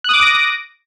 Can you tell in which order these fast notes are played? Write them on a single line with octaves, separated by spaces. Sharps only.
F#6 D#6 D6 D7 A#6